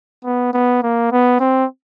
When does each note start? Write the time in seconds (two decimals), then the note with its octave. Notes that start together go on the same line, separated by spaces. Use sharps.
0.25 B3
0.54 B3
0.83 A#3
1.12 B3
1.40 C4